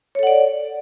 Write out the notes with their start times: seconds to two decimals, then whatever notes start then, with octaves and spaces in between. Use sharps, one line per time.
0.15 C#5
0.19 A4
0.23 F#5
0.27 D5